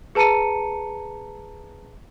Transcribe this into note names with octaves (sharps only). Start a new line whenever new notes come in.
G#4 B4 A5 A#5 C#7 D#7